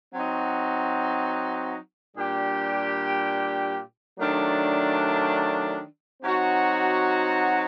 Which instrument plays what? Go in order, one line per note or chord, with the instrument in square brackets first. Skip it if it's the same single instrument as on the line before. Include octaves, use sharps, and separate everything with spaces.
[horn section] F#3 C4 D#4 F#4
A#2 G3 D4 G4
D#3 F#3 A3 D4
F#3 C4 D#4 F#4